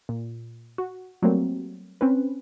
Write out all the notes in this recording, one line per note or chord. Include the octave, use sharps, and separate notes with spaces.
A#2
F#4
F#3 G3 A3 A#3 C4
C4 C#4 B4